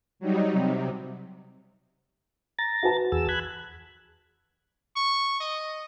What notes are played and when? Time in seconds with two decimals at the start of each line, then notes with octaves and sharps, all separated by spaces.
0.20 F#3 G3 D#4
0.53 C3
2.59 A#5 A6
2.83 F#4 B4 A5
3.12 E2 G#4 E6
3.29 B5 F#6 G#6
4.96 C#6
5.41 D#5